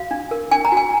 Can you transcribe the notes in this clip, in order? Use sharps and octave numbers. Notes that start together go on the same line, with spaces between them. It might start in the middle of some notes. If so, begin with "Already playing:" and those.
Already playing: F#4 F5
D4
A#4
D4 G#5
A#5
F#4 G#5